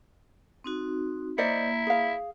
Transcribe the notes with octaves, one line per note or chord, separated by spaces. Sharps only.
C4 D#4 F#4
A#3 E4 C5 D5 D#5
G#4 F5